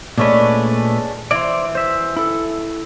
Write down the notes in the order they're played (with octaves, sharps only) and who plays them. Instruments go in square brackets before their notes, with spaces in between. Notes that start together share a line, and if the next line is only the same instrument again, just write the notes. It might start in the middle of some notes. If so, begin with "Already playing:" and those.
[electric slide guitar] A#2 A3 B4 [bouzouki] G#3 C#4 D4
[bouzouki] E3 [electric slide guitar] C5 D5
[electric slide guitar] C5 E5
E4 A4